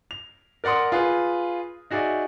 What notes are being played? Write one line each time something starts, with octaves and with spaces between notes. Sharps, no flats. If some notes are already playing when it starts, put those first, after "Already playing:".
F7
A#4 D5 F#5 C6 D#6
F4 G#4 B4
D#4 F#4 G#4 D5 E5